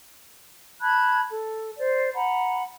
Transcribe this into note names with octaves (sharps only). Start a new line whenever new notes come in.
A5 B5 F#6 G#6
A4
C5 D5
F#5 A#5 B5